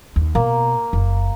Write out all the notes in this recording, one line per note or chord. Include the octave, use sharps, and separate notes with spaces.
D#2
B2 A#3
F#1